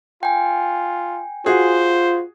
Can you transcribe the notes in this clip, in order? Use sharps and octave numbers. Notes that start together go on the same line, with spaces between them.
F4 G5 G#5
F4 F#4 G#4 C5